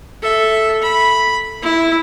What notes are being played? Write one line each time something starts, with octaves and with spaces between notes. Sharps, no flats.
A4 E5
B5
E4